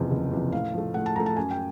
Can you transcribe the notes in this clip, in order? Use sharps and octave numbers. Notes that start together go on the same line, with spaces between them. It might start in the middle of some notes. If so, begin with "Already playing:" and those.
Already playing: F#1 E2 C3 F3
F#1
E2 C3 F3
A2 F5
F3 A3
A2 F#5
A5
F3 A3 A#5
A5
F#2 G#5
G5